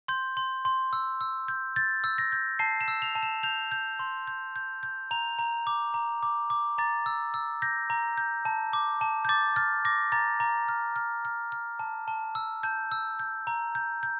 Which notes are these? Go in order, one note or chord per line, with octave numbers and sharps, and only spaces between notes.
C6 G6
C6
C6
E6
E6
G6
G6 A6
E6
A#6
G6
A5 C7
E7
E6
F7
A5
E7
G6 F7
G6
C6
G6
G6
G6
A#5 F7
A#5
D6
A#5
D6
D6
A#5 A6
E6
E6
G6 A#6
A#5
G6
A5
D6
A5
G6
D6 A6
F6 A6
D6 A#6
A#5 A6
A#5
F6
F6
F6
F6
A5
A5
E6
A5 G6
E6
G6
A#5
G6
G6